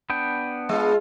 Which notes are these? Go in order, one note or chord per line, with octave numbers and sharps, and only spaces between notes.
B3 D4 G5
G#3 F4